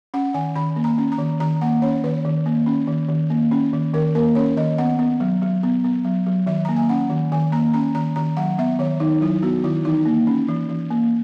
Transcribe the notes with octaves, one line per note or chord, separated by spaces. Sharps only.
C#4 F#5
D#3 G#5
D#3 B5
A#3
A#5
C#4
A#5
D#3
D#3 A#5
A#3 F#5
C#4 C#5
D#3 B4
D#3
A#3
C#4
D#3
D#3
A#3
C#4
D#3
D#3 A#4
A#3 A#4
C#4 C#5
D#3 D#5
B3 F#5
B3
F#3
F#3
B3
B3
F#3
F#3
D#3 E5
A#3 A#5
G#5
C#4 F#5
D#3
D#3 G#5
A#3 A#5
C#4 A#5
D#3 A#5
D#3 A#5
F#3 F#5
B3 E5
D#3 C#5
D#3 D#4
F#3 E4
B3 F#4
D#3 E4
E3 D#4
A#3
C#4
E3
E3
A#3